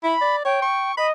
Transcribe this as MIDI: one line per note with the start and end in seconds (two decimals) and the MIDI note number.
0.03 0.15 64
0.03 0.36 83
0.21 0.44 74
0.45 0.58 73
0.45 0.91 79
0.62 0.92 85
0.97 1.11 75
0.97 1.07 83